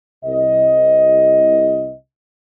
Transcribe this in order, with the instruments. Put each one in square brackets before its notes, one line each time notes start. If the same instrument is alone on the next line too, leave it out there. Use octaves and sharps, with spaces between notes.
[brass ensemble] C2 D#5